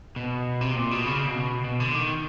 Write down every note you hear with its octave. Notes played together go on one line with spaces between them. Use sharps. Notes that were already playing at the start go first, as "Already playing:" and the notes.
B2
C3
A#2
B2
C#3
B2
B2
D3
D#3